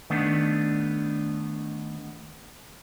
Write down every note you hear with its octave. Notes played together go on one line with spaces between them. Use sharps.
D#3 A3 B3 D4